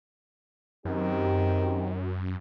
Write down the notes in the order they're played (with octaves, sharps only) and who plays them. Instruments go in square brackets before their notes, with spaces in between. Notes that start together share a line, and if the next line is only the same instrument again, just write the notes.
[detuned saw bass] F#2 [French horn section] D#3 C4 G4